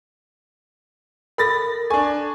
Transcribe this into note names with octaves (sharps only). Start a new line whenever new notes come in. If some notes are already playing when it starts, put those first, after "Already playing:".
A4 A#4 B5 A6 A#6
D4 A4 G#5 C#6